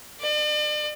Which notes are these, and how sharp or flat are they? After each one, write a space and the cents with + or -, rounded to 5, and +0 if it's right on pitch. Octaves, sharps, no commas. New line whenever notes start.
D5 +40